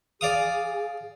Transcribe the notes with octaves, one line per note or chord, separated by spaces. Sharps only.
G#4 D5 F5 D#6